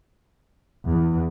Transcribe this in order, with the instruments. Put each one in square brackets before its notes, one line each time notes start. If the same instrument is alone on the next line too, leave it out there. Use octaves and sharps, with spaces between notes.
[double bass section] E2